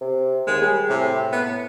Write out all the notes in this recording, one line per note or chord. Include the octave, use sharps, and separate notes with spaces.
C3
D#2 G#3
G3 G#4
A2 C3
B3